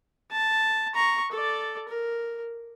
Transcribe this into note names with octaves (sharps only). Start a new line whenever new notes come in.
A5
A#5 C#6
A4 D5
A#4